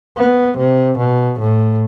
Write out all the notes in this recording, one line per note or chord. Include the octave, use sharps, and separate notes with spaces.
B3
C3
B2
A2